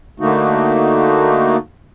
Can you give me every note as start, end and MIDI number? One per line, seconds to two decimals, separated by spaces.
0.20 1.57 50
0.20 1.57 57
0.20 1.57 58
0.20 1.57 63
0.20 1.57 66